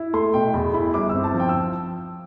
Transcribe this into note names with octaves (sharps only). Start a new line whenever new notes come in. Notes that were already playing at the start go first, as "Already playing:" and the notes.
Already playing: E4
A3 C6
B2 G5
E2 B5
E4 B5
G1 D6
C4 E6
A5
F3
G5
E6